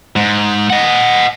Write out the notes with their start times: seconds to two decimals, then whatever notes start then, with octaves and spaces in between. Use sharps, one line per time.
0.16 G#2
0.70 D#5 F#5